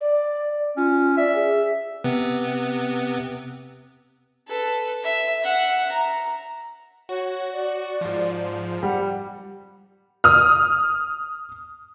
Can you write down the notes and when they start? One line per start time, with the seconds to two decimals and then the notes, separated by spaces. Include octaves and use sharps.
0.01 D5
0.77 C#4 F4
1.18 D5 E5
1.35 G#4
2.04 C3 B3
4.47 A4 B4
5.03 E5
5.42 E5 F#5
5.92 A#5
7.09 F#4 C#5
7.52 D5
8.01 G#2 F3
8.83 G3 F#5
10.24 D#6 F6